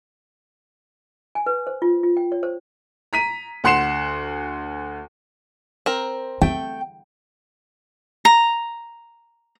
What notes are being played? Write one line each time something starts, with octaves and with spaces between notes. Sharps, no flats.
G#5
B4
C5
F4
F4
G5
C#5
C5
A#5 B6 D#7
D2 F#5 C6 C7 E7
C4 A#4
A3 C4 G5
A#5